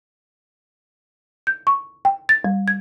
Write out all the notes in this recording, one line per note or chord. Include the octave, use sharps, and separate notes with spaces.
G6
C#6
G5
A6
G3
G#6